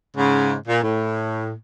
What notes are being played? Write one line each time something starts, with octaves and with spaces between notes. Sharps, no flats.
G#2 C#3
A#2
A2